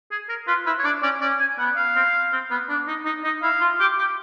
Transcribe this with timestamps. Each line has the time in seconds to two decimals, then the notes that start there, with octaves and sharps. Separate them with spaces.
0.11 G#4
0.29 A#4
0.47 F4 B4
0.66 E4 B4
0.79 C#5
0.84 D4 D5
1.03 C#4 D5
1.21 C#4 D5
1.40 G#5
1.58 B3 F#5
1.76 F5
1.95 C4
2.32 C4
2.50 B3
2.69 D4
2.87 D#4
3.05 D#4
3.24 D#4
3.43 E4 F5
3.61 F4
3.80 G4
3.98 G4